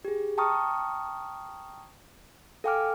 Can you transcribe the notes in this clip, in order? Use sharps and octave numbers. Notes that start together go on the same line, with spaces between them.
G4 G#4
G5 A5 A#5 C#6 D#6 F6
A4 F5 G5 G#5 D6 F6